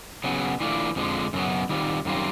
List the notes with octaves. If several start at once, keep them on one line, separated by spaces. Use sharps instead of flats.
C#3 F#3 B3
E3 A3 D4 F4
F2 D3 F3 G#3
F#2 C#3 F#3 B3
D#3 G3 C4 F4
F#2 D#3 G3 C4 F4